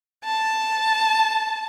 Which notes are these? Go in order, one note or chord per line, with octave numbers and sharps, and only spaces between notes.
A5